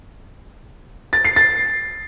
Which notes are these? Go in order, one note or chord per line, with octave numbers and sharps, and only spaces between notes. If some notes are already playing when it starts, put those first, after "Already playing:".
A6
C7
A6